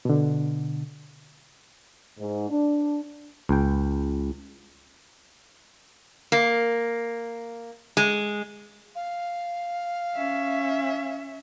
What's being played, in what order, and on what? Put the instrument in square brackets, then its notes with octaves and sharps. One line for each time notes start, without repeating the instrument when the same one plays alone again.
[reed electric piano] B2 D3
[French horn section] G#2
D4
[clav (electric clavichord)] C#2 G5
[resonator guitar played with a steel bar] A#3
G#3
[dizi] F5
[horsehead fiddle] C#4 E5